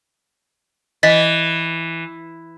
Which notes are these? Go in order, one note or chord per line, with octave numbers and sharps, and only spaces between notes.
E3 D#5 A6 B6